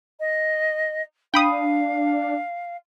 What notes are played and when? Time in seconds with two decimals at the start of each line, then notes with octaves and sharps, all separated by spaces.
0.20 D#5
1.34 D4 F5 G5 B5 D#6